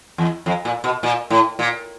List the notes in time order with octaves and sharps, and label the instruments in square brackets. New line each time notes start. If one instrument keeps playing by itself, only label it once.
[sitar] E2
F2
A#2
B2
A#2
A2
A#2